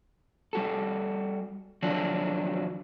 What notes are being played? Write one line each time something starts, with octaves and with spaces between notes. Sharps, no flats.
G3 F#4 A4
D#3 F3 F#3 D4 F#4